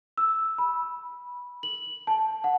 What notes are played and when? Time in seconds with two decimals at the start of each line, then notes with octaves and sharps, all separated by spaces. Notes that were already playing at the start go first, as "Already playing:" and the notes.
0.18 E6
0.58 B5
1.63 F#7
2.07 A5
2.44 F#5